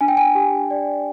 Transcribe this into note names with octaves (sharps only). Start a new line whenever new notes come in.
D4 G#5
G5
G#5
G4
D5